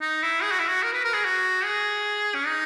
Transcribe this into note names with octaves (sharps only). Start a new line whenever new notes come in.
D#4
E4
G#4
F#4
E4
F#4
A#4
B4
A#4
G#4
F#4
G#4
C#4
D#4